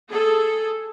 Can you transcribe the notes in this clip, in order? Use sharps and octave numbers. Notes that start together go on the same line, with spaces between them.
G#4 A4